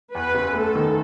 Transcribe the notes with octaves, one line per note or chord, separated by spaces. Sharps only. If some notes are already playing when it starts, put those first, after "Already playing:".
E2 B4
F#1
A3 A4
D#3